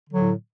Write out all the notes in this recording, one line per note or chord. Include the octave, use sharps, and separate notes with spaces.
A2 D3 F#3